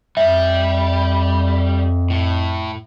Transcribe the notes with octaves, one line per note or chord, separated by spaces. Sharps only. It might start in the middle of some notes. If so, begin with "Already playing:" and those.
F2 G3 E5
A2